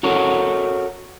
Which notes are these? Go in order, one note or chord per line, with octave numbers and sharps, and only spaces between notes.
F#4 A4 A#4 C#5